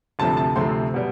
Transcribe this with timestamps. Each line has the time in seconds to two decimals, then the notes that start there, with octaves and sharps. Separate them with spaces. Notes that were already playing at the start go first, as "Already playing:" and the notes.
0.19 D2 C3 F3 A3 C4 A5
0.37 A5
0.55 D2 C3 F3 A3 C4 C6
0.94 B2 G3